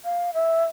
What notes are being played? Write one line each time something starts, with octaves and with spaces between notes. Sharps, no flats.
F5
E5